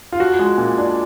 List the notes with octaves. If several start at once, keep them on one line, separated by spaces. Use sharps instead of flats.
F4
F3 F#4
G#3
A#2
D4